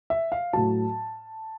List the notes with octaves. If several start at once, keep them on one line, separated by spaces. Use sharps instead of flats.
E5
F5
A2 F#3 A5